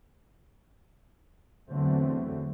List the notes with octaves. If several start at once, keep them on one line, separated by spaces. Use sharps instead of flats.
E2 D3 F#3 A3 C4